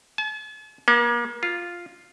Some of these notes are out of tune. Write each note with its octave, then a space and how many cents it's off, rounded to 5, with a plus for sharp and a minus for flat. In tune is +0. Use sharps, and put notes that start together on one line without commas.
A5 -45
A#3 +35
F4 +0